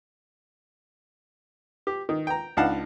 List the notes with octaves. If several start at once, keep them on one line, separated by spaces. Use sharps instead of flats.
G4
D#3
G5 A#5
C#2 D4 D#4 F5 F#5 A5